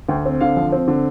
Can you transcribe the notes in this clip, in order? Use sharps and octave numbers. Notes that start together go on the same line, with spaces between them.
D2 G5
C4
D3 F5
F3
C4
D3